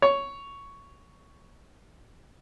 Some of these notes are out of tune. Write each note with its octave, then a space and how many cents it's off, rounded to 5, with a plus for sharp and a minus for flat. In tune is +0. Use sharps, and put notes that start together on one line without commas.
C#5 +5